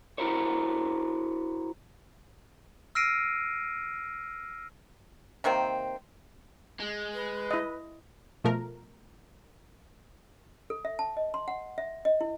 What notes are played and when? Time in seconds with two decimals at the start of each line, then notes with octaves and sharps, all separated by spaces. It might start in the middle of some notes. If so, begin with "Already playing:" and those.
0.18 E4 F#4 A#4 C5 C#5
2.95 E6 F6 A#6 C7 D7 D#7
5.44 C3 D#3 A#3 C4
6.80 G#3
7.14 B4
7.51 E4 D#5
8.44 B2 F3 A3 A#4
10.70 A4
10.85 E5
10.99 A5
11.17 D#5
11.34 C6
11.48 F#5
11.78 E5
12.05 D#5
12.21 E4